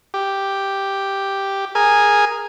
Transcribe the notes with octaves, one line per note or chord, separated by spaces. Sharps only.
G4
G#4 A#4 G#5